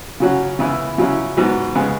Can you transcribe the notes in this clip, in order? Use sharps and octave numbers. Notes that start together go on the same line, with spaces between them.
C#3 F#3 C#4 F#4
C#3 E3 B3 E4
C#3 F#3 C#4 E4
G#2 F#3 B3 F#4
C#3 G#3 B3